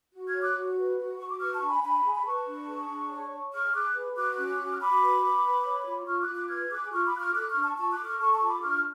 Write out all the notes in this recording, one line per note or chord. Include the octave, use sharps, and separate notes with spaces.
F#4
F6 G#6
C#5
D6 F#6
F#4
B4
F#4
F#4 C#6
D6
B4 C#6 F6
A5 C#6
D4
G#5 B5
D4 G#5 B5
G#4
B5
B4 A5 C#6
D4
G#4
D4
C#5
C#5
G#4 C#6 F6
G#4 D6 F#6
B4
F#4 D6 F#6
C#4
F#4
F6
F#4 B5 D6
B4
B4
B4
C#5
F4
F4 C#6 F6
D6 F#6
F4
D6 F#6
B4 F6 G#6
G#4 D6 F#6
F4 C#6 F6
B5 D6
F4 F#6
C#6 F6
A4 D6 F#6
C#6 F6
D4
A5 C#6
F4 A5 C#6
D6 F#6
A4
C#6 F6
A4 A5 C#6
A5 C#6
F4
B5 D6
D4 C#6 F6